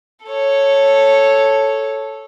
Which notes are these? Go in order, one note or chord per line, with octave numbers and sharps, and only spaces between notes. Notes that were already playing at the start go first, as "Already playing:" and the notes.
A4 C#5